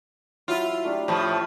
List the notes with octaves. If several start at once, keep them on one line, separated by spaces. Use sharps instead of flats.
F#3 E4 F4 E5
A3 D4 G4
A2 F3 C#5 A5 B5